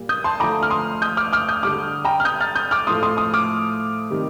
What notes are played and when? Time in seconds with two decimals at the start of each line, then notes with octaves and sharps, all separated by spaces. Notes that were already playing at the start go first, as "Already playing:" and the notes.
Already playing: A#2 G3
0.09 D#6 G6
0.24 A5 C6
0.40 D3 F3 A3 A#5 D6
0.63 F6
0.70 C6 D#6
1.02 D#6 G6
1.17 D6 F6
1.33 D6 F6
1.48 D#6 G6
1.63 D3 G3 D6 F6
2.05 G5 A#5
2.20 F6
2.25 D#6 G6
2.41 F6 A6
2.56 D#6 G6
2.71 D6 F6
2.87 A2 F3 A3 C6 D#6
3.03 C6 D#6
3.17 C6 D#6
3.34 D6 F6
4.10 C3 D#3 G3